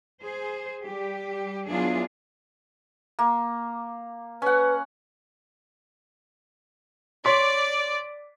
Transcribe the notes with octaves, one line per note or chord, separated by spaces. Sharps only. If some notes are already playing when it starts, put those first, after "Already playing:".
G#4 C5
G3 G4
F#3 B3 D4 E4 F4 G#4
A#3
C#4 B4 F#5
C#5 D5 C6 B6